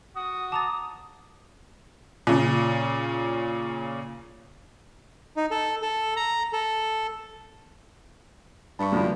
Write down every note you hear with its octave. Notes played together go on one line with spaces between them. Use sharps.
F#4 D#6
A5 A#5 D6 A6
A#2 C#3
D#4
A4
A4
A#5
A4
G2 A5 B5 C#6
F#2 D3 F3